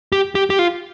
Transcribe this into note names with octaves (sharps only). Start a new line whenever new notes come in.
G4
G4
G4
F4